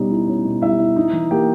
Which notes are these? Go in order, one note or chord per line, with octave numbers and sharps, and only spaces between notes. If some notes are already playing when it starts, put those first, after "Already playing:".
Already playing: B2 G3 C#4 D#4
E4
C#4
B2
G3 E4 E5
E4
D#4
E3
A#3 G4 G5